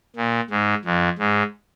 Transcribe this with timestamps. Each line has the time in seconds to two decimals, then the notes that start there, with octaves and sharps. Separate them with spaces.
0.16 A#2
0.50 G#2
0.85 F2
1.19 G#2